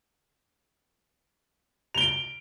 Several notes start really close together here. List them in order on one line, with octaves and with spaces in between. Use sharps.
F7 G7 D7